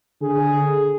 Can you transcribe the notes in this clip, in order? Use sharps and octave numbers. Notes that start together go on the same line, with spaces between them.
D3 G#4